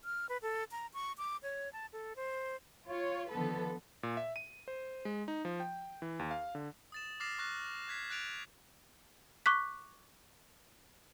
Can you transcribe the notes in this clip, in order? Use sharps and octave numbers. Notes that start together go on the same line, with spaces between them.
F6
B4
A4
A#5
C#6
D6
C#5
A5
A4
C5
F4 C#5
D3 D#3 F3 B3 A4 B4
A#2
E5
D#7
C5
G#3
D#4
F3
G5
E3
D#2
F5
D3
D#6 A6 E7
D6 F6 A6 A#6 C7 E7
C#6 F6 F#6 A#6
F#6 G#6 B6 C7
F#6 A6 D7 F7
C#6 D6 F#6 B6